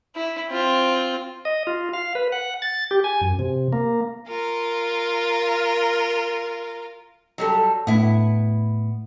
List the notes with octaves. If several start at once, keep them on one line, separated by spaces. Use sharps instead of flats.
E4
C4 F4
D#5
F4
F5
B4
F#5
A6
G4
G#5
F#2
C3
A#3
F4 A#4
F#3 G3 A4
A2 B3 E4